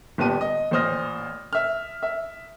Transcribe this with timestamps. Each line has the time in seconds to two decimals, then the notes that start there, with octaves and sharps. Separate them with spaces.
0.18 G1 A#2 B3 G4 A5 D#7
0.41 D#5
0.71 A1 A#2 C5 D#6 F6 A#6
1.53 E5 F6
2.03 E5